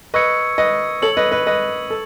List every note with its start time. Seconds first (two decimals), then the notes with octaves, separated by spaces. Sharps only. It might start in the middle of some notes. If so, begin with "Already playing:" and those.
0.14 B4 D#5 C#6 E6 G#6 C#7
0.58 B4 D#5
1.02 A4 C#5 E6 G#6 C#7 F#7
1.17 B4 D#5
1.32 B4 D#5
1.47 B4 D#5
1.90 A4